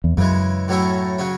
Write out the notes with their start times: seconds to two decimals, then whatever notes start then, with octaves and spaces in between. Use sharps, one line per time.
0.04 E2
0.17 F#2 C#3 E3 G#3
0.68 A2 F#3 A3 C#4 E4
1.19 C#3 F#3 C#4